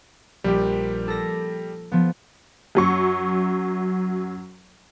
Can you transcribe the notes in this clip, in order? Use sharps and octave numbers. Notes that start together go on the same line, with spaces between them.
A#1 G3 G4
A4 A#6
F3 B3
F#2 F#3 C#6